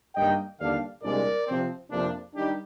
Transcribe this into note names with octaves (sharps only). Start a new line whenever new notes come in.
G2 D#3 A#3 D#5 G5
D#2 D3 G3 D4 D5 F5
C2 A#2 G#3 D4 A#4 D5
C3 F3 C4
F2 C3 F3 A#3 D4
D#3 G3 D4 D#4 G4